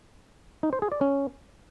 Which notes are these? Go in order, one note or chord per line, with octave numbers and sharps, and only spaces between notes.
D#4
C5
G#4
D5
C#4